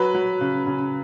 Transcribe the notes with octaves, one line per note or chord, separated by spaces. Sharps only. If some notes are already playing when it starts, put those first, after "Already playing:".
Already playing: F#3 B4
F#3
C#3
C#3